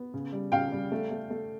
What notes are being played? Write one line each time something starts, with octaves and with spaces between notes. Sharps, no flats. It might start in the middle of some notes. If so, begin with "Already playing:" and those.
Already playing: B3
C#3
G3
C#3 F5 G5
G3
A3
A3
A3